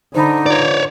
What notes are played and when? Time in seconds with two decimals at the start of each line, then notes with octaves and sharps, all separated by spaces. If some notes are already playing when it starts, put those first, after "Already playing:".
0.15 D3 D#4 C5 A5 B5
0.46 F4 B4 C#5 D5